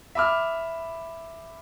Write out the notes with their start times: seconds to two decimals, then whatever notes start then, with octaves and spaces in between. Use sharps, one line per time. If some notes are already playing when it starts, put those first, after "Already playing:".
0.15 E5 B5 D6 F6